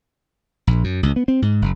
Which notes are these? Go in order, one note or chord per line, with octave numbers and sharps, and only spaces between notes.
A#1
F#2
C#2
B3
C4
G#2
F#1